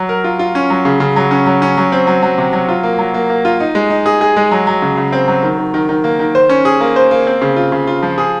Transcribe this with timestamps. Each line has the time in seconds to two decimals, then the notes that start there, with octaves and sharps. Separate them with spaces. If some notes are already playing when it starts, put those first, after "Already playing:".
Already playing: F#3
0.09 A#4
0.24 F4
0.39 F4
0.55 C#4
0.70 F#3
0.85 C#3
1.00 C#3
1.16 F#3
1.31 C#4
1.46 F#3
1.62 C#4
1.77 F#3
1.92 C4
2.07 F#3
2.23 F#3
2.38 C3
2.53 F#3
2.69 F4
2.83 A#3
2.99 F#3
3.14 A#3
3.30 A#3
3.45 F4
3.60 D#4
3.75 G#3
3.90 D#4
4.06 G#4
4.21 G#4
4.36 G#3
4.51 F#3
4.67 F#3
4.82 C#3
4.97 C#3
5.12 C4
5.28 F#3
5.43 D#3
5.58 D#3
5.74 D#3
5.89 D#3
6.04 A#3
6.19 D#3
6.35 C5
6.49 C#4
6.65 G#4
6.80 A#3
6.96 C5
7.11 A#3
7.27 C4
7.42 C#3
7.56 F4
7.72 C#3
7.87 F4
8.03 F3
8.18 G#4